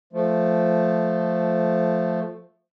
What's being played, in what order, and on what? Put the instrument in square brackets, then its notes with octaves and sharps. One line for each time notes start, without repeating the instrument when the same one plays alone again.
[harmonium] F3 A3